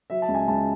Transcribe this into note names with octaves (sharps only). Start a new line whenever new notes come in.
F#3 E5
A5
C#2
G#5
C#2 A5